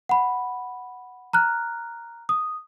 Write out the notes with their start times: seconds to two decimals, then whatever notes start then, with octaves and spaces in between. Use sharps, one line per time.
0.09 F#5 B5
1.33 A#5 F6 F#6
2.29 D#6